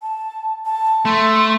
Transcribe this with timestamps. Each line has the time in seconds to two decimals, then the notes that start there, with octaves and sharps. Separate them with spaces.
0.02 A5
0.66 A5
1.05 A3 C6